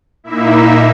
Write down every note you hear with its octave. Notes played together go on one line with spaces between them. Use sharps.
A#2 A#3 D#4 E4 E5